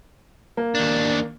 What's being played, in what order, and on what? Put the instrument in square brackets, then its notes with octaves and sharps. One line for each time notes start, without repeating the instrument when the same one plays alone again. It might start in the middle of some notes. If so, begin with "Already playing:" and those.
[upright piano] A#3
[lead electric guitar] D#2 D4